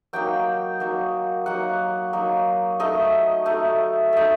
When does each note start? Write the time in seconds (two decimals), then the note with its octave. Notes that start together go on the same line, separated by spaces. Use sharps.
0.13 F#3 A#3 D#4 G5
0.80 F#3 A#3 D#4
1.46 F#3 A#3 D#4 F#5
2.13 F#3 A#3 D#4
2.80 A3 D#4 D#5
3.46 A3 D#4
4.13 A3 D#4